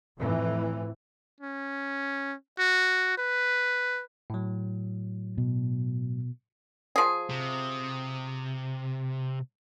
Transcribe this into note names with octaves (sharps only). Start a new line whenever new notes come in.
F2 A2 E3
C#4
F#4
B4
A2 F#3
B2
F3 G#4
C3